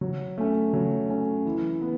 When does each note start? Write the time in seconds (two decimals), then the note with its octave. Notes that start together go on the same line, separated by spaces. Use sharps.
0.01 F#3
0.38 A3 C#4
0.73 F#3
1.09 A3 C#4
1.46 E3
1.82 B3